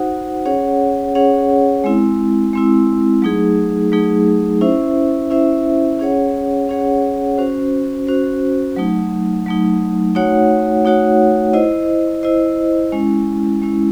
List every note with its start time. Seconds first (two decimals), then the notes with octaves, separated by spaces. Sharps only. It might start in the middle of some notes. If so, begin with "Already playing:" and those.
Already playing: D#4 F#4 C5 F#5
0.46 C#4 G#4 C#5 F#5
1.15 C#4 G#4 C#5 F#5
1.84 G#3 C4 E4
2.53 G#3 C4 E4
3.22 F#3 A3 D#4 G#4
3.92 F#3 A3 D#4 G#4
4.61 C#4 E4 C5 E5
5.30 C#4 E4 C5 E5
5.99 C#4 G#4 C#5 F#5
6.69 C#4 G#4 C#5 F#5
7.38 C#4 F#4 C5
8.07 C#4 F#4 C5
8.76 F#3 A3 D#4
9.46 F#3 A3 D#4
10.15 A3 D#4 F#4 C#5 F#5
10.85 A3 D#4 F#4 C#5 F#5
11.53 E4 C5 D#5
12.23 E4 C5 D#5
12.92 G#3 C#4 E4
13.62 G#3 C#4 E4